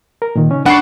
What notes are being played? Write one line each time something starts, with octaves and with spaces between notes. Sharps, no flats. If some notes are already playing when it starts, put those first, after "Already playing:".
A#4
A#2 D#3
C#3 C#4 D#4
D4 F#5 B5 C#6 C7